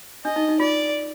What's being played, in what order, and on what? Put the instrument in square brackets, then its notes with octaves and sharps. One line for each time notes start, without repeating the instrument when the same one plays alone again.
[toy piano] D4 [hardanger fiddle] D#5
[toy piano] D#4
D#4
[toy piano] F4 [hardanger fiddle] D5